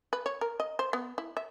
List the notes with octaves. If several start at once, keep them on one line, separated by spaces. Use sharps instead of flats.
B4
C#5
A#4
D#5
C5
B3
E4
E5